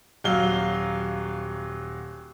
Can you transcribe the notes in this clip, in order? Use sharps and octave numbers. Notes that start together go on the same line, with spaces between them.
D#1 F#3 F5 G7